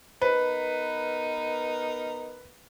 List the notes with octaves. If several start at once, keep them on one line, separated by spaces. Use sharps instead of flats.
B3 D#4 A#4 B4